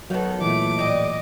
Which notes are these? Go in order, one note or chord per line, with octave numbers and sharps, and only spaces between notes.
D#3 F#3 B3 F#4 A4
A#2 E3 A3 D6
A2 G3 D#5